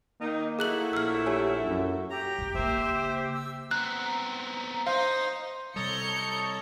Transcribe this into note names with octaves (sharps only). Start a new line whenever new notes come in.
D#3 A#3 D#4
F#3 A3 E4 G#4 F#6 F#7
A#1 E6 F6
G4 C#5 G#5
F#2
G4 A#5
G1 F2
C#3 A#3 C5 E5
E6
B3 C4 A#5 F#6
D#4 C5 F5
C3 G3 A4 C#5 D#5 A#5 G6 C#7